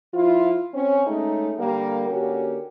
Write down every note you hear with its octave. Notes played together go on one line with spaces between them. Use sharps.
F3 E4 F4
C4 C#4
G#3 A3 C#4 D#4
D3 G3 A#3
D3 A#3 C#4 F#4 G4